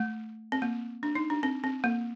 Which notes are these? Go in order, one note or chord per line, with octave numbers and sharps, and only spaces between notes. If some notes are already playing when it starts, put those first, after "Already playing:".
Already playing: A3
C4
A#3
D4
D#4
D4
C4
C4
A#3